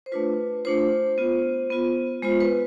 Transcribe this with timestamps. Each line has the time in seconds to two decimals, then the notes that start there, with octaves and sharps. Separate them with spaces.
0.06 C5
0.12 A3 D4 F4 B4
0.65 A3 D4 F4 C5
1.18 B3 F4
1.70 B3 F4
2.22 G#3 B3 F4 C5
2.40 B4